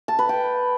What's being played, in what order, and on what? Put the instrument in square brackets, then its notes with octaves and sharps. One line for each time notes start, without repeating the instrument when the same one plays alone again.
[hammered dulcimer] A5
B4
G5